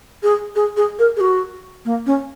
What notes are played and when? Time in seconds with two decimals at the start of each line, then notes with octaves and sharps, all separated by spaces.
0.23 G#4
0.55 G#4
0.77 G#4
0.99 A#4
1.16 G#4
1.20 F#4
1.85 A#3
2.06 C#4